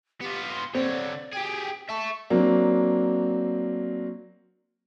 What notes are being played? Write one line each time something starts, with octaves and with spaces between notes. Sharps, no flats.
B3 F4 G4
C6
D3 C4 C#5 D5
G4 G#4 G5
E5 A5 C#6
F#3 A#3 C4 D4